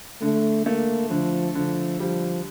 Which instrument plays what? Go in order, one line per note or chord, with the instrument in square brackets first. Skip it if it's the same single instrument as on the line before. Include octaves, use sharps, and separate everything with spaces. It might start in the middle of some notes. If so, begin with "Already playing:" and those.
[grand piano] D3 [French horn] A3
[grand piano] A3 [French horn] A#3
[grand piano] D3 [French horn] F3
[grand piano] D3 [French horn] F3
[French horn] F3 [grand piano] G3